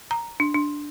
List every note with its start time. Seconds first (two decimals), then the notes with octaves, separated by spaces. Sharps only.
0.11 A#5
0.40 D4
0.54 D4